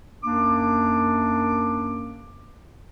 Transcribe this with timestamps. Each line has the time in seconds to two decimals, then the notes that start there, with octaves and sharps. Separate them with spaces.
0.23 F#2 A#3 D4 D6